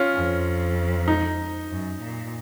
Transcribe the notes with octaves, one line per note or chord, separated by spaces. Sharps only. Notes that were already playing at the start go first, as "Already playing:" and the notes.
Already playing: C#4 F4
F2
D#4
F#2
A#2